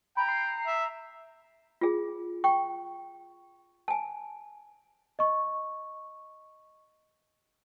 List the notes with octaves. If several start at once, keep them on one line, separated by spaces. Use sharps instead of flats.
G5 A#5 B5
C7
E5
F4 G#4
G5 C#6
G#5 A5
D#5 C#6